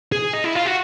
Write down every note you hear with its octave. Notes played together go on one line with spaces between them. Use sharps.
G#4
D#4
E4
F4
F#4